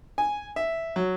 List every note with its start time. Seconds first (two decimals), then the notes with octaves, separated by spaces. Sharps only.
0.18 G#5
0.56 E5
0.96 F#3